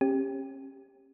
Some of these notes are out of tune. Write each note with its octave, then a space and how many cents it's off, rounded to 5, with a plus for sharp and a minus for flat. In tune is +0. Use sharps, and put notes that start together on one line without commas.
C#4 -35 G4 +15